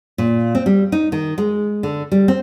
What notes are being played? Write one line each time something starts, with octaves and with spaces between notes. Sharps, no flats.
A#2
C4
G3
D#4
D#3
G#3
D3
G3
C4